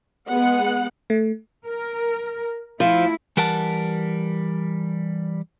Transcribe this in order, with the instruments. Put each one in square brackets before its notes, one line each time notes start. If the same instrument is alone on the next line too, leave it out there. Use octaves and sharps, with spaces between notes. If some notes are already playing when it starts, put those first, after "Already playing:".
[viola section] G#3 B3 F#5
[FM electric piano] A3
[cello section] A#4
[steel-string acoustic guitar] F3 [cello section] A3 E4
[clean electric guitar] E3 G3 A#4 F#5 A5